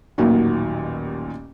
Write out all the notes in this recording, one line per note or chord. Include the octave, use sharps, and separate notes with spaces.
A1 D#2 A#2 D#3 F#3